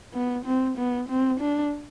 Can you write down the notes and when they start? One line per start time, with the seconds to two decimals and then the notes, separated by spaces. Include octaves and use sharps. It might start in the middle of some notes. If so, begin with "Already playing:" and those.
0.13 B3
0.45 C4
0.77 B3
1.09 C4
1.40 D4